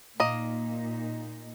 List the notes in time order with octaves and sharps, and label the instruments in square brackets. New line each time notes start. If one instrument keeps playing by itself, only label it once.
[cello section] A#2 D#4 [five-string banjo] A#3 D#5